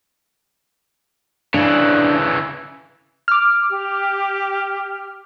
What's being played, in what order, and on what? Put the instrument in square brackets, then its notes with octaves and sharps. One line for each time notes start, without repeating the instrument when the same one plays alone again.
[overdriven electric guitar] C#3 E3 [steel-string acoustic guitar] D4
[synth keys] D6 F6
[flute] G4